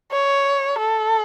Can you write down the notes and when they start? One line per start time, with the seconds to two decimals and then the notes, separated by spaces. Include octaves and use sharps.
0.12 C#5
0.79 A4